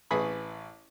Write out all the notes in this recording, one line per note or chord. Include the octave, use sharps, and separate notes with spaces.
A1 E3 G#4 B5 C#6 D#6